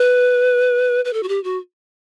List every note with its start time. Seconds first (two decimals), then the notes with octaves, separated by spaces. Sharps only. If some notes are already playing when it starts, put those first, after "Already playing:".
Already playing: B4
1.05 B4
1.13 A4
1.23 F#4
1.28 G4
1.44 F#4